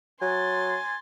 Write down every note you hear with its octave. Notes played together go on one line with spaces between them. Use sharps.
F#3 G#5 C6 A6